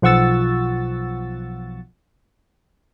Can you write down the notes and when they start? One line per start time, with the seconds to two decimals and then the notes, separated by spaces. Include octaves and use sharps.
0.02 B1 F3 F#5 C#6 E6 A6